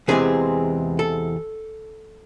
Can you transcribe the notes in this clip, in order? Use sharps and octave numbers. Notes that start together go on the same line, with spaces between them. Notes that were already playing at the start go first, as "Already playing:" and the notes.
E2 C3 E3 G#3 C4 G#4
A4